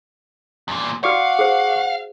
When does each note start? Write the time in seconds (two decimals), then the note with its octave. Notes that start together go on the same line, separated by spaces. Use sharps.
0.68 E2 A#2
1.04 F#4 D5 F5 F#5 C#6 D6 F6
1.39 G#4 C5